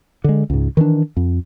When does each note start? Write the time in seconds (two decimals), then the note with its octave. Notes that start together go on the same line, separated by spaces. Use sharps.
0.24 D3 G#3
0.50 C#2 G#2
0.77 D#3 E3 G#3 D4
1.16 F2